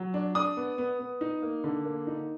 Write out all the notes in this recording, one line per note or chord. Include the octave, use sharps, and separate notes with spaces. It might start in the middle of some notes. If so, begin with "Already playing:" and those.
Already playing: F#3
D4
D4 D#6
B3
B3
B3
D#4
A#3
D3
A#3
D#4